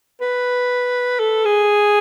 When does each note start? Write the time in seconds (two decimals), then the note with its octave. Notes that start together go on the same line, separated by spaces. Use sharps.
0.21 B4
1.20 A4
1.45 G#4